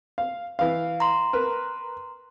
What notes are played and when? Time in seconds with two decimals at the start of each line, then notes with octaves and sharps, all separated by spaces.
0.18 F5
0.59 E3 F5
1.00 A#5 C6
1.33 A#4 B4